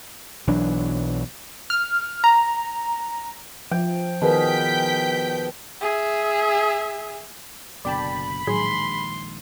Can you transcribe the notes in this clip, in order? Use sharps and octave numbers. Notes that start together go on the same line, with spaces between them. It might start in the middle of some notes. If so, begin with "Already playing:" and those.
B1 E3 F#3 D4
F6
A#5
F3 G5
B2 D#3 G#4 A#4 G5 G6 B6
G#4 E5
F#1 B2 D3 D5 G5 A5 B5
A#1 A2 D#3 F#3 G#3 G#4 C6